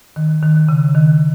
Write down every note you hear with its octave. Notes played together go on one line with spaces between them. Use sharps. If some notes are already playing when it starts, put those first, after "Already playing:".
D#3
D#3
C#3
D#3